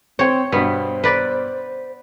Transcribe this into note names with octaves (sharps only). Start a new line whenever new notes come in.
C4 C5 C#5 G5
G2 B2 B3 C5
B4 D5